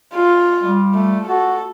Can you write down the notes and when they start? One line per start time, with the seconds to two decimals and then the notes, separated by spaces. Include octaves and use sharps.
0.14 F4
0.62 G3
0.94 A3
1.27 F#4 A4